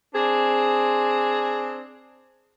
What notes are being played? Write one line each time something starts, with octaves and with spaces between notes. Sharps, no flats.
C4 D4 G#4